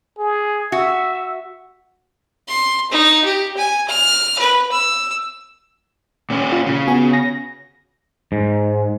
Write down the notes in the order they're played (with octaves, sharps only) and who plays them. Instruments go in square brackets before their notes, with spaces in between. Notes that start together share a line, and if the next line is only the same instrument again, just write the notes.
[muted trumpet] G#4
[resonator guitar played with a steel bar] F#4 [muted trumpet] E5
[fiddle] C6
D#4
G4
G#5
F6
B4
E6
[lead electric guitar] A#2 C#4
[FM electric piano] F4
[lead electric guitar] C#3
[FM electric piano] B3 F#4 G#5
A#6
[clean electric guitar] G#2